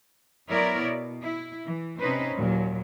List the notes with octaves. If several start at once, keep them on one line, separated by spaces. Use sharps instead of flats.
F#3 B3 E4 A#4 C#5 D5
B2
E4
E3
C3 C4 C#4 D#4 B4 C5
D#2 A#2 F#3